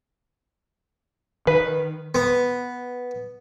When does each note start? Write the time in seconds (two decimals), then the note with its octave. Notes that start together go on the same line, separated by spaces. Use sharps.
1.47 D#3 B4
2.15 B3